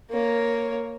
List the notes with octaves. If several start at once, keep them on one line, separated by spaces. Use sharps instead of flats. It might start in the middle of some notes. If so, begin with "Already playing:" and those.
A#3 C#5